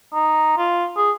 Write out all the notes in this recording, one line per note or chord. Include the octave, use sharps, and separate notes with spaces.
D#4
F4
G#4